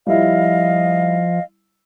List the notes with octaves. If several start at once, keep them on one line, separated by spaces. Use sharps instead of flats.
F3 G3 E4 D#5 F5